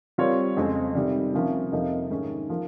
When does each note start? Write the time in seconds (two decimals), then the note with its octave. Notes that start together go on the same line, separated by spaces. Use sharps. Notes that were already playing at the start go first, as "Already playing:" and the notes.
0.18 G3 C4 F4 A#4 C#5
0.57 F2 C#3 G#3 C4
0.95 C3 D#3 G3
1.34 C3 F3 A#3 C#4
1.72 F2 C3 F3 A#3 D#4
2.10 G#2 D#3 A#3 C#4
2.49 F3 A#3